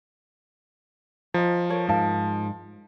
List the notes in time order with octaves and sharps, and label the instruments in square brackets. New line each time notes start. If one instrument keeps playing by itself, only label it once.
[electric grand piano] F3 [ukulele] D#5 A#5
[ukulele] A4 A#4 C#5
[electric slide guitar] G#2 [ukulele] A#4 F5 A5